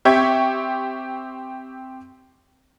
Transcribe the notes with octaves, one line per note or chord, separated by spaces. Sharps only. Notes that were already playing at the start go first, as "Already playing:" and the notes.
C4 G4 E5 C#6 G#6